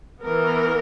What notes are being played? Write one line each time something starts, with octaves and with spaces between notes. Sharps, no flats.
E3 B3 A#4